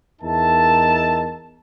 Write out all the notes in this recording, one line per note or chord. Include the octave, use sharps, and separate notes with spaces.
E2 D#4 A#4 E5 A5